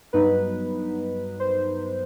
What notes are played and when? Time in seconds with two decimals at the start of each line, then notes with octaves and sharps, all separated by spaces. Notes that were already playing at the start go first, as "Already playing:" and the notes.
0.13 G2 F#3 B3 D#4 B4
1.40 C5